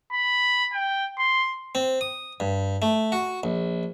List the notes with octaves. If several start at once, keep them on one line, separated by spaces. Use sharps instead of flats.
B5
G5
C6
C4
D#6
G2
A3
F#4
A#1